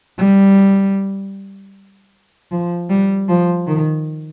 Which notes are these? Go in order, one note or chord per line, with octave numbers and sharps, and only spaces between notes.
G3
F3
G3
F3
D#3